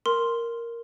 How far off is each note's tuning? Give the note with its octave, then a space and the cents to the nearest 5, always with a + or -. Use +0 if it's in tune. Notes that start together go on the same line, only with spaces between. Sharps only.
A#4 +0 C6 +0